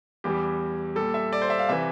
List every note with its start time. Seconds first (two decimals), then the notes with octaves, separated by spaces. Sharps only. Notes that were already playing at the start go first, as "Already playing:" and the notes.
0.24 E2 E3 G3 G4
0.96 A#2 G3 A4
1.14 E5
1.33 D5
1.42 C5
1.50 E5
1.59 F5
1.69 C3 E3 E5